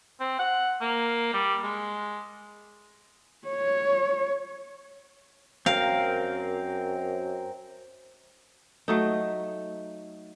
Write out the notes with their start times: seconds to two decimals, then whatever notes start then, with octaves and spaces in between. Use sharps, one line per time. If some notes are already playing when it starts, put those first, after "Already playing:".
0.20 C4
0.39 F#5
0.81 A#3
1.33 G3
1.63 G#3
3.48 C#5
5.66 F#2 C4 A#4 F5
8.88 F#3 A3 D#4